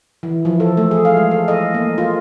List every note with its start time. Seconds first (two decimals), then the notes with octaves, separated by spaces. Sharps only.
0.23 E3
0.45 F3
0.60 A4
0.77 A3
0.91 G#4
1.05 F5
1.17 G#3
1.31 A4
1.48 D#5
1.74 A#3
1.98 F4